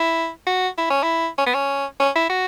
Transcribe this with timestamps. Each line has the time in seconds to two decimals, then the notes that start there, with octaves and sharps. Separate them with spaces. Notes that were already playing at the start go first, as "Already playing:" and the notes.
Already playing: E4
0.47 F#4
0.78 E4
0.90 C#4
1.03 E4
1.38 C#4
1.46 B3
1.54 C#4
2.00 C#4
2.16 E4
2.30 F#4